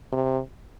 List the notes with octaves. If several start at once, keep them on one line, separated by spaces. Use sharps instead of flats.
C3